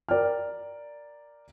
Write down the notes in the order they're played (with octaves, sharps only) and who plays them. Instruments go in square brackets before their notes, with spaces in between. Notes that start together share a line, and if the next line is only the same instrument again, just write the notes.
[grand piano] A#4 D5 G5 F6